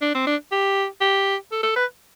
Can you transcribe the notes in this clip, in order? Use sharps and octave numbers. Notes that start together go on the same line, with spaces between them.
D4
C4
D4
G4
G4
A4
A4
B4